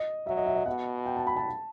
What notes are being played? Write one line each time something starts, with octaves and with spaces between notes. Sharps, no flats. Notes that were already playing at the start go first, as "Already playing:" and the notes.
Already playing: D#5
F#3 E5
D#5
E5
D#5
B2 F#5
G5
A5
B5
A5